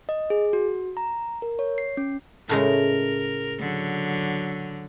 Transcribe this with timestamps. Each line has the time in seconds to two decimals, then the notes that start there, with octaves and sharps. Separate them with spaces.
0.09 D#5
0.30 G#4
0.53 F#4
0.97 A#5
1.42 A#4
1.59 C#5
1.78 C7
1.97 C#4
2.49 A2 C#3 G#3 A#4
3.60 D3 F#3